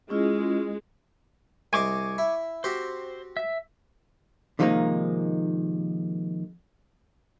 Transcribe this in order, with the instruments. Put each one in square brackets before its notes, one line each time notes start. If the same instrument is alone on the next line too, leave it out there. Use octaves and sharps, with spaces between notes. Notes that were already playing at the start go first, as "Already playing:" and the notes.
[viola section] G#3 [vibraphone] C#4 E4 F4
[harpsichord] C2 C5 D#5 [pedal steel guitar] G#5 C#6 D6
[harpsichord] E4
[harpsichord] C4 F#4 G4 [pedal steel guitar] C5
[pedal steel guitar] E5
[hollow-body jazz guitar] C3 D#3 F3 G#3 A#3 D#4